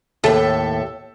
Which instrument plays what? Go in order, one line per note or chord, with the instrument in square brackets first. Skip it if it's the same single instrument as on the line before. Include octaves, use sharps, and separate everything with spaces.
[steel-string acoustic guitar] D#2 A2 [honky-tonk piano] A4 E5 E6